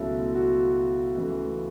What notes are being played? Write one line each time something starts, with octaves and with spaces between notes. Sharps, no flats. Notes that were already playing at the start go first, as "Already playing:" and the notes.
Already playing: C#2 B2 F#3 A3 E4
F#4
C#2 C#3 E3 A3